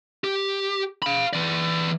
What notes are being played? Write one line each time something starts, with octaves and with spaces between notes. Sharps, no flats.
G4
F5 B5
E3 D5